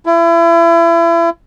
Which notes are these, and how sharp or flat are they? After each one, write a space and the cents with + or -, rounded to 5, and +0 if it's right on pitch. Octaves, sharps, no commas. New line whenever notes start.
E4 +35